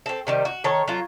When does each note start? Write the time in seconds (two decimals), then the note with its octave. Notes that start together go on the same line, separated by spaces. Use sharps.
0.06 C4 A4
0.27 C3 D#3 G3
0.45 F#4
0.64 D#3 A4 C#5
0.88 F#3 F4